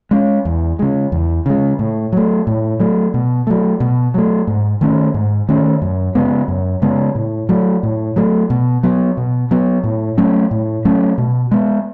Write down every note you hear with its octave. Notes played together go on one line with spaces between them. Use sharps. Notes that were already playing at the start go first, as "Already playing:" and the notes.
G#3 C#4
E2
C#3 G#3
E2
C#3 G#3
A2
F#3 A3
A2
F#3 A3
B2
F#3 A3
B2
F#3 A3
G#2
D#3 A3 C#4
G#2
D#3 A3 C#4
F#2
C#3 G#3 B3
F#2
C#3 G#3 B3
A2
F#3 A3
A2
F#3 A3
B2
F#3 B3
B2
F#3 B3
A2
F#3 A3 C#4
A2
F#3 A3 C#4
B2
G#3 B3